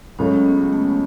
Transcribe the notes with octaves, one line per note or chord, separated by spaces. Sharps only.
C#2 C#3 F#3 A3 C#4
B3
A3